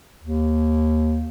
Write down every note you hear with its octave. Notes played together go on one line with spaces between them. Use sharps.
D#2